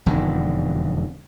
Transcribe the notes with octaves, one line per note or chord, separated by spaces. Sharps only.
E1 F2 D3 D#3